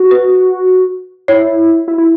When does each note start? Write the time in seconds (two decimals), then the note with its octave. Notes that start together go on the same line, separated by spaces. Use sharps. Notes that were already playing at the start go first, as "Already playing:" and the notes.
Already playing: F#4
0.11 B4
1.28 E4 C#5
1.88 E4
1.98 E4